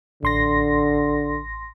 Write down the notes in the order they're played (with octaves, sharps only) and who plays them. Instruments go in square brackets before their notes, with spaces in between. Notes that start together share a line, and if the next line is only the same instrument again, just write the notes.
[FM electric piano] A1 C6 A#6 [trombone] D3